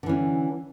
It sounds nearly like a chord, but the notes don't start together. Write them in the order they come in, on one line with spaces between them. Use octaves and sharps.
D3 E3 C#4